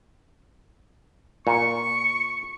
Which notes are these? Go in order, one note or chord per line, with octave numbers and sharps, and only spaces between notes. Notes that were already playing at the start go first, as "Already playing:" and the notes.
A#2 C#6 C#7